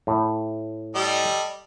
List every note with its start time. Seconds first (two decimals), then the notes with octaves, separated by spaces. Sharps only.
0.07 A2
0.95 G3 A4 D#5